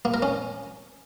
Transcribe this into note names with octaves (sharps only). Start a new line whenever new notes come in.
A#3
A#4
C#4